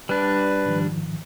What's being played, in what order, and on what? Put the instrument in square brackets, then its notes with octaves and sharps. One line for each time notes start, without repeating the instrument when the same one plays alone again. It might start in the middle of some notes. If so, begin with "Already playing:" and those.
[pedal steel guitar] G3 D4 [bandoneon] B4
[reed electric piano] G#2 D#3 F3